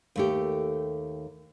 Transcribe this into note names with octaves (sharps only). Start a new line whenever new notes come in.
D#2 A3 G4